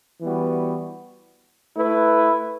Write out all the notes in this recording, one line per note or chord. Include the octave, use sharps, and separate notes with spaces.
E3 G3 B3 F#4
A3 E4 B4